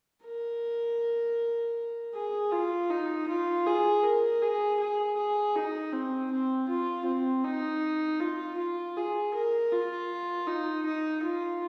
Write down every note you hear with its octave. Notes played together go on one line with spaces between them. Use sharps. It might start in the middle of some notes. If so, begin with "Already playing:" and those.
A#4
G#4
F4
D#4
F4
G#4
A#4
G#4
G#4
G#4
D#4
C4
C4
F4
C4
D#4
F4
F4
G#4
A#4
F4
D#4
D#4
F4